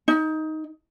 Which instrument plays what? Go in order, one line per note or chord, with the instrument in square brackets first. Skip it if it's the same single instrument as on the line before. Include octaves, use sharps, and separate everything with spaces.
[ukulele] D#4